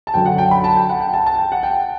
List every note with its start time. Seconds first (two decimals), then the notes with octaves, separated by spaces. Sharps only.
0.07 A5
0.14 F#2 D3 F#3 G5
0.26 F#5
0.38 G5
0.51 B5
0.64 A5
0.77 G5
0.89 F#5
1.01 G5
1.14 A5
1.26 A5
1.38 G5
1.52 F#5
1.63 G5